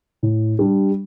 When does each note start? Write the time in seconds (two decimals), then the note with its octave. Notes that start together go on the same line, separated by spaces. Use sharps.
0.23 A2
0.59 G3 D4 G4